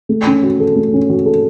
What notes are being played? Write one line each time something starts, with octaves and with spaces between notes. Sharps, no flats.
A3
C#4
F#4
A4
A3
C#4
F#4
A4